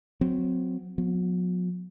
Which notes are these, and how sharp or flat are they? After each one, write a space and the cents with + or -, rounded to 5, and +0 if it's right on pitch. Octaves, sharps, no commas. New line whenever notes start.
F#3 -15 C4 -25
F#3 -45 B3 +0